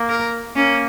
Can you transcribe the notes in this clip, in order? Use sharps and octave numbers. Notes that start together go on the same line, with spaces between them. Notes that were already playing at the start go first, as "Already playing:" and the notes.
Already playing: A#3
A#4
A#3 C#4